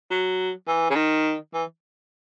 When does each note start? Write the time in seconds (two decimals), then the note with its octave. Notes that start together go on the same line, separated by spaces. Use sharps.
0.11 F#3
0.68 E3
0.90 C#3
0.96 D#3
1.54 E3